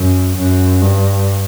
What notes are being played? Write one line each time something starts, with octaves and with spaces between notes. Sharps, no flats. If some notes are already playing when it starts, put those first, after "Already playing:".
Already playing: F#2
F#2
G2